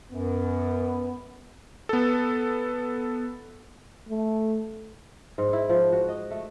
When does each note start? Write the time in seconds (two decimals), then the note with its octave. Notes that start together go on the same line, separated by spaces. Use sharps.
0.12 F#2 B3
1.89 B3 A4
4.09 A3
5.38 G#2
5.53 E4
5.69 F3
5.92 F#4
6.09 D#5
6.31 A3